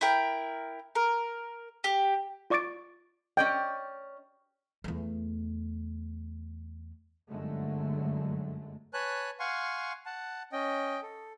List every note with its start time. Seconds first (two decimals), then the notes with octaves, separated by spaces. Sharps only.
0.01 E4 A#4 G5
0.95 A#4
1.84 G4
2.50 F4 D5 C#6 D6 A6 D7
3.37 C#4 D5 D#5 G5
4.84 E2 A3
7.31 G1 F#2 D3 F#3 G#3 A3
8.94 B4 C#5 G#5 A5 F#6
9.40 F5 F#5 G#5 C6 C#6
10.06 F#5 A5
10.52 C#4 D#5 G5
11.02 A4